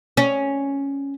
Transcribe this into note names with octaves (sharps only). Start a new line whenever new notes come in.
C#4